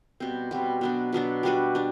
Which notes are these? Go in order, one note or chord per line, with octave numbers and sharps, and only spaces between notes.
B2 G3 C4
B2 G3 C4
B2 F#3 B3 D4
B2 F#3 B3 D4
G3 D4 F#4 B4
G3 D4